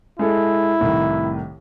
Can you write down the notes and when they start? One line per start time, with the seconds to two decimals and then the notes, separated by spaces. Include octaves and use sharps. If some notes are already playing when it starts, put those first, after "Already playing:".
0.19 G#3 E4 A4
0.80 C2 A2 D#3